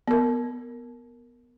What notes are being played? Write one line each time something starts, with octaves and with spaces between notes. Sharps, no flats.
B3 A#4